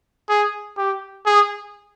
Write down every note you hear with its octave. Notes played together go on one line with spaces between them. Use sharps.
G#4
G4
G#4